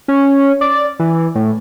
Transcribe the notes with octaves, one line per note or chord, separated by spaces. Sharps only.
C#4
D5
E3
A2